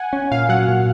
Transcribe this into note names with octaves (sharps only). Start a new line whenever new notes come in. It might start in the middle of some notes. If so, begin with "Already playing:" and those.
Already playing: F#5 G#5
C#4
A#2 F5
F#3 F#5
A#2